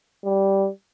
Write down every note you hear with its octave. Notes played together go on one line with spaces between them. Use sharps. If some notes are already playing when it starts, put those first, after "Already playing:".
G3